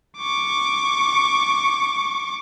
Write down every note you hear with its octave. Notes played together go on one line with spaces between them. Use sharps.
C#6 D6